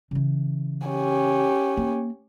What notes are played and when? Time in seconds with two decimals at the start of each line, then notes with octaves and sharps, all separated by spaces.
0.11 C#3 E3
0.87 C#4 G4
1.77 A#3